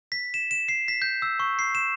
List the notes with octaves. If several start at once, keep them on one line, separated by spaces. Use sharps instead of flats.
B6
E7
E7
C7
B6
G6
E6
C#6
C7
E7